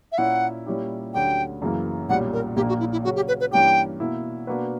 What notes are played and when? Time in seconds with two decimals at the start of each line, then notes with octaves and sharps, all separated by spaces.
0.12 E5
0.18 A#2 A#3 C#4 E4 F#5
0.66 A#2 G3 C#4 E4 G4
1.14 D2 D3 F#3 C#4 G4 G5
1.62 F#2 C#3 E3 A#3
2.09 B1 A#2 G3 C#4 F#5
2.33 A#4
2.56 A#1 A#2 A#3 G4
2.69 F#4
2.80 E4
2.92 E4
3.04 C#3 F#3 C#4 F#4
3.16 G4
3.28 B4
3.40 B4
3.51 G2 E3 A#3 C#4 G4 G5
4.00 B2 A#3 E4
4.47 B2 A#3 D4 F#4 B4